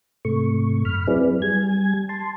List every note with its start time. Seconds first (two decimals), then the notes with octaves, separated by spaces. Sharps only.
0.25 G#2 C3 A3 C#6
0.85 F#2 B5 F6
1.07 F#3 C4 E4 G#4 B4 D5
1.42 G3 G#5 G#6
2.09 A5 C6